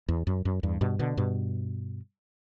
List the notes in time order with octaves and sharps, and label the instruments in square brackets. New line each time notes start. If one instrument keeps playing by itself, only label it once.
[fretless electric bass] E2
F#2
F#2
E2 G2
G2 B2
B2 D3
G2 B2